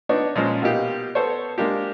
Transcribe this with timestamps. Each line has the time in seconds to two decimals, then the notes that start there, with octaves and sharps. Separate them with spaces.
0.09 B3 D4 D#4 C#5
0.36 A#2 F3 G#3 C#4 C5
0.62 B2 A#3 D#4 G4 F5
1.15 B3 A4 C5 C#5
1.58 G#3 A#3 D4 G4